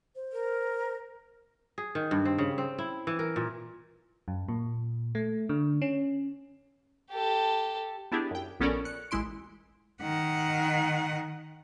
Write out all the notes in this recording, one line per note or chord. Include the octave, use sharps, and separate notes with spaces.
C5
A#4
G#4
D#3
G2
C4
C#3
C4
E4
E3
A#4
A#2
F#2
A#2
A3
D3
C#4
G4 A4
B3 D4 E4 G4 G#4
F#2 G5
A#1 B3 C#4 A4 A#4 D5
F#6 C#7
A1 G#3 E4 C6 D7
D#3 F#5